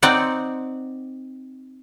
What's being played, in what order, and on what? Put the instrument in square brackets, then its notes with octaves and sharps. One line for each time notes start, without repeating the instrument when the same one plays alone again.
[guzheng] C4 D#4 D5 F#5